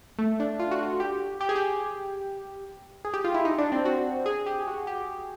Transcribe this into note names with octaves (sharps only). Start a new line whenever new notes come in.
A3
D4
F4
F#4
F4
G4
G4
G#4
G4
G#4
G4
F4
E4
D#4
D4
C4
F#4
G#4
G4
F#4
G4